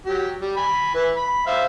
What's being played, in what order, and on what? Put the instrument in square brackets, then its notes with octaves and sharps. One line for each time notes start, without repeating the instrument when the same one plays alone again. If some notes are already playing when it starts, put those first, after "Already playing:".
[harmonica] F#3 G4
G3
G#5 B5
E3 E4 B4
B5
C5 E5 F5